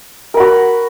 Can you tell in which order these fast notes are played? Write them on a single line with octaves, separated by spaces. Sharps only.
A#4 B5 F#4